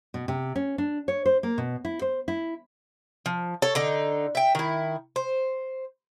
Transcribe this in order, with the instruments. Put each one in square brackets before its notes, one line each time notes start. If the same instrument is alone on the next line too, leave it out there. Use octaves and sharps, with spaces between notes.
[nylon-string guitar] B2
C3
C#4
D4
C#5
C5
A#3
B2
E4
C5
E4
[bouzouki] F3
A4 C#5
D3 D#4
E5 G5
D#3 E4
C5